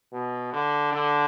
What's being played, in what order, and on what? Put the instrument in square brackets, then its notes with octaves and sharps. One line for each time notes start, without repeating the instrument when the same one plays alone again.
[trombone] B2
D3
D3